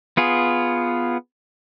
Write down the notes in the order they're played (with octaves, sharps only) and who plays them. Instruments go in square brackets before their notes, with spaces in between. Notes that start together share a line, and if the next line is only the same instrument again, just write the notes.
[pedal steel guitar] B3 F4 G#4